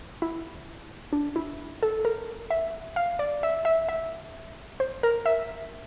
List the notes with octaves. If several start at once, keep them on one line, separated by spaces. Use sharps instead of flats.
E4
D4
E4
A4
A#4
E5
F5
D5
E5
E5
E5
C5
A#4
E5